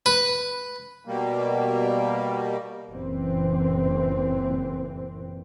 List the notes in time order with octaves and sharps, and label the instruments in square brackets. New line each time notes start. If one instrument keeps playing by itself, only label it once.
[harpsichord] B4
[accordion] B2 G3 A#3
[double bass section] F#1 A#2 E3 C4